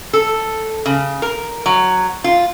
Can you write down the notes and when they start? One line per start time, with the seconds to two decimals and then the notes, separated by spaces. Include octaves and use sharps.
0.13 A4
0.86 C#3
1.22 A#4
1.66 F#3
2.24 F4